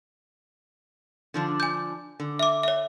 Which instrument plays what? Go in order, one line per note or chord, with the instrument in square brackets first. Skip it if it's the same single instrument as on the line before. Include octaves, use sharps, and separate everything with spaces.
[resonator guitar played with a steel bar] D3 F3 D4
[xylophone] G#5 G6
[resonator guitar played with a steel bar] D3
[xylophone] E5 D6
C#5 E5